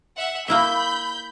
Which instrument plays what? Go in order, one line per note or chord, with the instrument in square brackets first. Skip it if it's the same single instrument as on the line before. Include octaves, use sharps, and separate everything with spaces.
[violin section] E5 F#5
[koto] A#3 E4 E5 [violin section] B5 G6